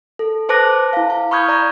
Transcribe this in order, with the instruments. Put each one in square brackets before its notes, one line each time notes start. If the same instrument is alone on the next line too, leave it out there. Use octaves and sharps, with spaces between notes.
[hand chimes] A4
B4 C5 A5 D6 F#6 A#6
E4 F5
F5
B5 C#6 D#6 F6 G6 G#6
D5 A#5 B5